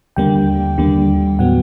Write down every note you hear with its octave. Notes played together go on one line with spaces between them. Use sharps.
D#2 D3 G3 A#3 G5
D#2 D3 G3 A#3
A2 F#3 B3 F#5